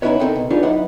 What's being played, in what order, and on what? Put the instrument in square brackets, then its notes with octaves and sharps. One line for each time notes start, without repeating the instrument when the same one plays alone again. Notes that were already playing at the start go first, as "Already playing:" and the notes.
[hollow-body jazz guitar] B3 C#4 D#4 E4 B4 C#5
B3 C4 D#4 A4 A#4
B2
D4 D#4 F4 G#4 B4 C#5
F#2 D#4 E4 B4 F#5